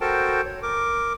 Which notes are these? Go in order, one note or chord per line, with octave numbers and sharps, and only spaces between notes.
F#4 A4 A#4 C5 G5 A5
C#5
A#4 D6